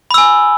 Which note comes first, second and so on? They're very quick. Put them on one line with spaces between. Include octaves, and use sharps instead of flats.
B5 E6 G#5